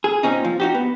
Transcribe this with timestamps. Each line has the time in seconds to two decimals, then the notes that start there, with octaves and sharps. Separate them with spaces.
0.04 G#4
0.23 A#2 C4 C#4 D#4
0.45 F3
0.60 D#4 F#4 G4
0.75 B3